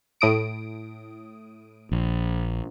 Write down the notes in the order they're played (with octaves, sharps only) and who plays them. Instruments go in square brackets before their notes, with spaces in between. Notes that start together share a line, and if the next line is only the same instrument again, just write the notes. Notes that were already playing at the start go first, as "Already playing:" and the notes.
[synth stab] A2 D#6 D7
[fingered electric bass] A#1